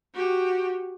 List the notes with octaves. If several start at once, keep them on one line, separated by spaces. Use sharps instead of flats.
F#4 G4